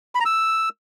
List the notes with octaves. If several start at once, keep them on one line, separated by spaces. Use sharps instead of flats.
B5
A#5
E6